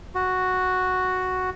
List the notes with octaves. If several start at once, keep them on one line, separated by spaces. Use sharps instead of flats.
F#4